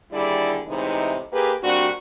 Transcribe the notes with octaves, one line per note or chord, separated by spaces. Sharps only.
D#2 D3 G3 E4 G#4 D5
A2 C3 E3 G#3 D#4
A#3 G4 G#4 B4
A#2 G3 C4 D4 F#4